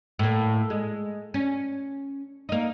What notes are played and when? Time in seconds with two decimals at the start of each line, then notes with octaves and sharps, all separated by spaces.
0.19 A2 A#3
0.70 G#3
1.34 C#4
2.49 A#3 D#4